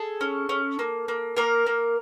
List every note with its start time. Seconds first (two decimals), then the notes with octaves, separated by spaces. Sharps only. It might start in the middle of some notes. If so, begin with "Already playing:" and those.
Already playing: G#4 A4
0.21 C#4
0.49 C#4
0.79 A#3
1.08 A#3
1.36 A#3 A#4
1.66 A#3